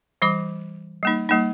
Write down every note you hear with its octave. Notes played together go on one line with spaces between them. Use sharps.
E3 G3 B5 D6
G3 A#3 D#4
G3 A#3 D#4